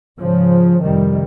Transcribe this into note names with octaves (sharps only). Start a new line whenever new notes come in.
G#2 C#3 F3
F2 C3 D#3 G3